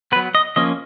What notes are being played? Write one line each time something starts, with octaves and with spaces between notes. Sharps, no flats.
F#3 B3 B4
D#5
F3 A#3 C#4 D#5